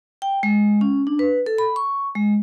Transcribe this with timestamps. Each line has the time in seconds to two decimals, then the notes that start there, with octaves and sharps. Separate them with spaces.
0.22 G5
0.43 G#3
0.81 C#4
1.07 D4
1.19 B4
1.46 A4
1.58 B5
1.76 C#6
2.15 G#3